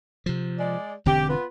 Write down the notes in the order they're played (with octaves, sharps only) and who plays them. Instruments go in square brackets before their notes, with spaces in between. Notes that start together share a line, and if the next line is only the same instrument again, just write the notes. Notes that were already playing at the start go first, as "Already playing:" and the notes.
[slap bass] C3 F3
[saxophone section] G#3 D5
[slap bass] E1 D3 C4 [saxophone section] G4
[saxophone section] B3 F4 B4